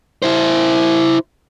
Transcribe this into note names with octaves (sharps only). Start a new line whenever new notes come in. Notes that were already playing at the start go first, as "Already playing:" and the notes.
E4 C5